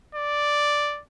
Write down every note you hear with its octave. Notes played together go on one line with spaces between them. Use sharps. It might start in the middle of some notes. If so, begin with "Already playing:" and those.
D5